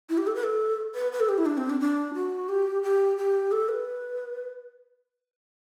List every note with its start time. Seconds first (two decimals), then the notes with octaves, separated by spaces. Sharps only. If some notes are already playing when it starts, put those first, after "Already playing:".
0.10 E4
0.18 G4
0.27 A4
0.36 B4
0.43 A4
0.95 B4
1.12 B4
1.20 A4
1.29 G4
1.38 E4
1.46 D4
1.57 C4
1.70 D4
1.80 D4
2.15 F#4
2.49 G4
2.83 G4
3.17 G4
3.52 A4
3.69 B4